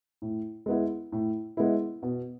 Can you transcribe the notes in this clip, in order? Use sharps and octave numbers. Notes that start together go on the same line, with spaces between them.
A2
G#3 B3 E4
A2
G#3 B3 E4
B2